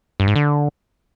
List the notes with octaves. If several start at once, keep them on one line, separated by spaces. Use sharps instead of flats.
G2
G#2
D3